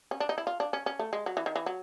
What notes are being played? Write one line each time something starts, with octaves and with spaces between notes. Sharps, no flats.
C#4
D4
D#4
E4
F4
D4
C#4
C#4
A3
G#3
F#3
E3
D#3
E3
F#3